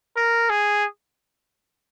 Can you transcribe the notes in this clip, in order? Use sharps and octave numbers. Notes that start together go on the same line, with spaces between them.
A#4
G#4